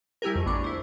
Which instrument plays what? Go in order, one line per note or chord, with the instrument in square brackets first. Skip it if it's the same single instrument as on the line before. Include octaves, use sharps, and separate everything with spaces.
[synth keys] G3 E4 G4 G#4 A#4
F2 D#3
A1 D3 B3 D4 C#6 D6
E4 C5